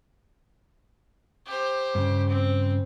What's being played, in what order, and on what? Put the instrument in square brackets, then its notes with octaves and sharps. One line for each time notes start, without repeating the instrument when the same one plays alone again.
[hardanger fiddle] G4 C5
[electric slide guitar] G2 C#3
[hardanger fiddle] C4